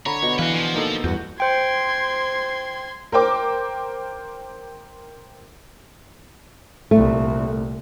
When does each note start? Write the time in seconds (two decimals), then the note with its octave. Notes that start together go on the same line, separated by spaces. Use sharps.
0.06 D3 C#5 A#5 B5
0.22 B2
0.39 E3 F#4 B4 F5
0.54 F3 G#5
0.75 A#3 D#4 A4
1.04 E2 G2 F#4 F#5 G6
1.40 C5 G5 C6 G#6
3.12 A#4 C5 G5 D6
6.91 C2 A#2 A3